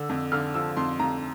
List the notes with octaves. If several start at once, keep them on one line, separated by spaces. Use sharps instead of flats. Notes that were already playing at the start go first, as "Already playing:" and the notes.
Already playing: D3 E6
F2
D3 F6
F3 E6
F2 C6
F2 A#5